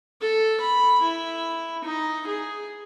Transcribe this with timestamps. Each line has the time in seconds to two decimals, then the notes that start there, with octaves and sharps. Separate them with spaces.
0.21 A4
0.61 B5
1.02 E4
1.84 D#4
2.27 G#4